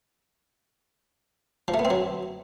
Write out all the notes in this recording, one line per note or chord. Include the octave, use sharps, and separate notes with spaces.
F3
A3
B3
C4
F#3